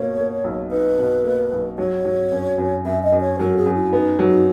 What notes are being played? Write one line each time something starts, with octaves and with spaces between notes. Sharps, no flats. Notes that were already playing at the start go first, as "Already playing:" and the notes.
Already playing: B2 A#3 C#5
A#3
B1
D#4 B4
B2
A#3
B1
F#3 C#5
F#3
F#2
F#2
F#2 E5
D#5
F#2
C#5
F#3 A#4
G#4
F#2
E4
B3 D#4
F#3